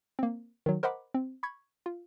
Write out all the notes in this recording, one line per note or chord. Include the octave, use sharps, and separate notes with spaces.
A#3 C4
D#3 F#3
A#4 C5 D#5 F#5 B5 D6
C4
B5 C#6 G#6
F4